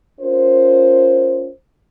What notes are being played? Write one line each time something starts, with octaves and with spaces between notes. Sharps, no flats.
C#4 F4 A#4 C5